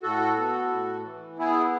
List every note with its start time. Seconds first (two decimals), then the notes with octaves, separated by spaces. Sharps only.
0.02 A2 F#4 A4
0.37 B3
0.71 A2
1.05 E3
1.38 B3 E4 G#4